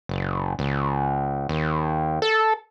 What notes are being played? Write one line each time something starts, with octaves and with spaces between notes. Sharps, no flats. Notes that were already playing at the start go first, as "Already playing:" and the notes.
F#1
C#2
D#2
A4